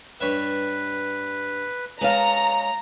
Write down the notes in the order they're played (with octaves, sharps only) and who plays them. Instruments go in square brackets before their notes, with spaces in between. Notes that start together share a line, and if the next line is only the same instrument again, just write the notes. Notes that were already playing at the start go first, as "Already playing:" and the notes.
[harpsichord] G2 C#5 E5 [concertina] B4
[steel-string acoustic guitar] G#3 C#5 F5 [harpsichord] B4 D#5 A5 [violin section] A#5